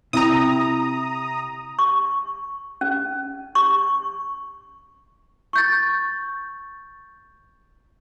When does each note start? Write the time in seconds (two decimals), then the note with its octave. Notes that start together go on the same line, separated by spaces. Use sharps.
0.13 C3 E4 A#5 D#6
1.79 C#6
2.81 C#4
3.55 C#6
5.53 C#6 G6 A6